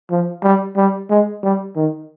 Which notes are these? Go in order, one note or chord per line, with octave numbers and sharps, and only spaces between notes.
F3
G3
G3
G#3
G3
D#3